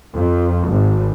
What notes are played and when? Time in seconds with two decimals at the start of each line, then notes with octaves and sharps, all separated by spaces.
0.14 F2
0.69 G#1